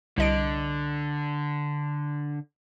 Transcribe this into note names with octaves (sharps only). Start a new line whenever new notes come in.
C2 D3 D#5 D7